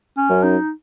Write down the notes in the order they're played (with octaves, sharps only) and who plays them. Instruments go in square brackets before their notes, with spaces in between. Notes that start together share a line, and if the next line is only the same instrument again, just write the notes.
[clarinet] C#4
[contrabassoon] F#2
[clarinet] D#4